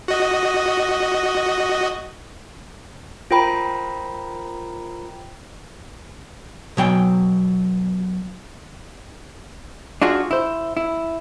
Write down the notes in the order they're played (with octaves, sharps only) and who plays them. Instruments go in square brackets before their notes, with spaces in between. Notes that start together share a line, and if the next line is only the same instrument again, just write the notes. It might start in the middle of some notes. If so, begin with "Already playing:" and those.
[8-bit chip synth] F#4 D#5
[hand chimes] F4 A#4 C5 G5 A#5 B5
[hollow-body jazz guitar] B2 F#3 G5 G#5
D4 F4 F#4 G#4
E4 C5
E4